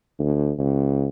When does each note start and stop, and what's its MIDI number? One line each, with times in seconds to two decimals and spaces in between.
0.19 0.52 38
0.58 1.08 37